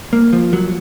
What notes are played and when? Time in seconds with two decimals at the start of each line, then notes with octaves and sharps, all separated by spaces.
0.13 A#3
0.33 F3
0.53 F#3